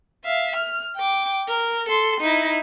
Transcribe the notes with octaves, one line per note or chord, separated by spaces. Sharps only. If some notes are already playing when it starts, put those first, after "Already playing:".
E5 F5
F6
G5 D6
A#4
A4 C6
D#4 E4